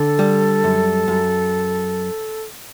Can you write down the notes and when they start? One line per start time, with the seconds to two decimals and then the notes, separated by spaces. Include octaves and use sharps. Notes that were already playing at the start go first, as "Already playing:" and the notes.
Already playing: D3 A4
0.19 G3
0.64 F#2
1.08 F#2